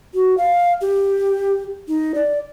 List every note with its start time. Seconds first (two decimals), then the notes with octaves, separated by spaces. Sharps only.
0.14 F#4
0.38 F5
0.81 G4
1.88 D#4
2.15 D5